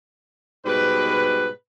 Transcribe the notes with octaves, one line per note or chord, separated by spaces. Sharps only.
G#2 B2 G3 B4